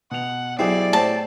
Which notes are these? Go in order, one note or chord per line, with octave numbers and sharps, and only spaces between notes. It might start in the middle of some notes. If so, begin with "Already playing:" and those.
B2 F#5 F7
B1 C4 E4 G4 G#4 D5
A2 C4 A5